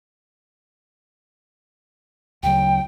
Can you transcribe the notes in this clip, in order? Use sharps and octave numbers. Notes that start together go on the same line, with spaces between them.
D2 C#3 F#3 G5